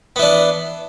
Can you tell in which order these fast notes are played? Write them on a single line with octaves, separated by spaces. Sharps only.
B3 E3 D4